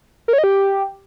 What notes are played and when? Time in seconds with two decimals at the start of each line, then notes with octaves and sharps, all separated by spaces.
0.28 A#4
0.33 C#5
0.38 D#5
0.44 G4